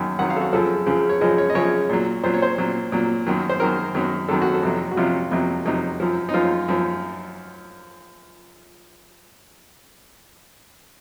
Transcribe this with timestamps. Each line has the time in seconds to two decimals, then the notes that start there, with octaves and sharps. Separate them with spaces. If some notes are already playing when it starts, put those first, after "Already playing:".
Already playing: F#2 D#3 F#3
0.19 F#2 D#3 F#3 F#5
0.30 F5
0.37 A4
0.41 F#4
0.53 F#2 C#3 F3 A4
0.86 F#2 C#3 F3
1.09 C#5
1.21 F#2 C#3 F3 D#5
1.38 C#5
1.50 D#5
1.55 F#2 C#3 F3 C#5
1.89 A#2 F#3
2.23 A#2 F#3 C5
2.34 C#5
2.42 C5
2.58 A#2 F#3
2.92 A#2 F#3
3.26 F#2 D#3 F#3
3.50 C5
3.60 F#2 D#3 F#3 A#4
3.95 F#2 D#3 F#3
4.29 F#2 D#3 F#3 A4
4.42 F#4
4.54 A4
4.63 F2 C3 F#3
4.91 F#4
4.97 F2 C3 F#3 F4
5.31 F2 C3 F#3
5.65 F2 C3 F#3 D#4
6.00 F#2 F3
6.29 D#4
6.34 F#2 F3 F4
6.68 F#2 F3